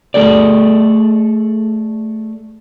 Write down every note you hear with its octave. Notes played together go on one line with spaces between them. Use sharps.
A3 G#4 A4 D5